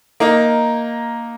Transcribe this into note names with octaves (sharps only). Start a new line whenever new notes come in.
A#3 D#4